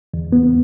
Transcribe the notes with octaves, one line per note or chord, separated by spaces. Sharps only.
E2
B3